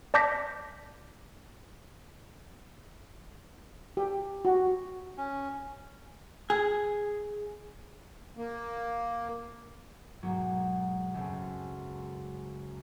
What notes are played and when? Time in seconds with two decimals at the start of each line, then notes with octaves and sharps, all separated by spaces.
0.14 D5 A5 D6 G6 A#6 B6
3.97 G4
4.45 F#4
5.18 C#4
6.50 G#4
8.37 A#3
10.23 B1 G#2 F#3 G#3 A#3
11.14 C#2 F#2 G#3 A3 C4